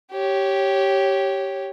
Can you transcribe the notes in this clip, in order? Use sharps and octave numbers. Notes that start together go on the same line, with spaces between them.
G4 C#5